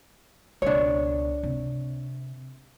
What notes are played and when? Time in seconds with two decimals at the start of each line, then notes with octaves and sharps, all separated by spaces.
0.62 C#2 B2 D4 C#5
1.43 C3